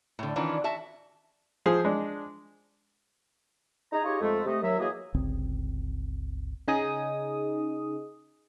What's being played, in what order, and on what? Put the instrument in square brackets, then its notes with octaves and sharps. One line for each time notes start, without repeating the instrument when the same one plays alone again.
[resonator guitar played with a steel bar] A2 D3
D#3 E3 C#4 D4 F4
F#4 E5 A5
[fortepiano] F3 G#4 C5
G#3 D4
[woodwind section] D#4 G#4 A#5
D#4 F4 G4 G#4 C#5 D#5
F2 G#3 A3
C3 A3 D#5
D#2 F#3 E5
E3 F#3 A#3 G#4 D#5
[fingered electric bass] G1 C#2 C4
[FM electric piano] C#3 D#4 G#4 D#5 D#6